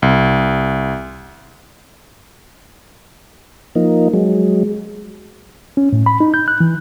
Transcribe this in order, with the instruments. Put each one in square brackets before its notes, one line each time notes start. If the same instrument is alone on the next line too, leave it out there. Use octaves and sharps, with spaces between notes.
[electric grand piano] C2
[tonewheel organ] F3 A#3 D#4
F#3 G#3
[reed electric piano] C#4
A2
B5
D#4
G6
F#6
E3